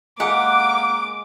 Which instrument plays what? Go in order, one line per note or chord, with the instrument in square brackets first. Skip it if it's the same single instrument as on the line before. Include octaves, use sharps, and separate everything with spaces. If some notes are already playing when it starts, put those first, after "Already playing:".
[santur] G#3 [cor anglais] A#3 [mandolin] G4 F#5 [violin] D6